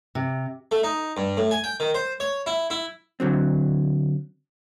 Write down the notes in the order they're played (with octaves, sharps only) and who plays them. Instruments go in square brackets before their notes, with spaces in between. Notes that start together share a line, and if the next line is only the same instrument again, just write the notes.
[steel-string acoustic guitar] C3
[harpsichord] A3
D#4
G2
A2
G#5
G5
D#3
C5
C#5
E4
E4
[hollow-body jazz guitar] D3 F#3 C4